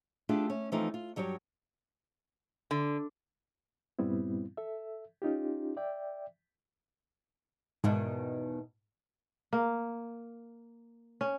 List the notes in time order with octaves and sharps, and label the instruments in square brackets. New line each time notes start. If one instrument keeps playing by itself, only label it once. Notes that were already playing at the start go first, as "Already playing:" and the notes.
[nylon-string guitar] A3 D4 F4 G4 G#4
C#4
E3 F3 A3 C4 D#4 F4
F4
G2 F#3 G3 G4 C#5
[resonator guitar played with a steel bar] D3
[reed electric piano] G2 A#2 G3 B3 C4 E4
A4 E5
C#4 D#4 F4 G4
D5 E5 G5
[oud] E2 B2 D#3 [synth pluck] G#2
[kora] A#3
C#4